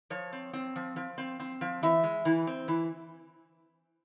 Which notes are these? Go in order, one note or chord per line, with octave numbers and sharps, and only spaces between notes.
F3 C#5
C4
C4
F3
F3
C4
C4
F3
E3 E5
G#3
E3
C4
E3